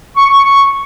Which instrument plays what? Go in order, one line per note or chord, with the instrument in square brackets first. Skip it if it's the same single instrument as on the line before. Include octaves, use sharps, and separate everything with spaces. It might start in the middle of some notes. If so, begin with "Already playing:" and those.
[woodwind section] C#6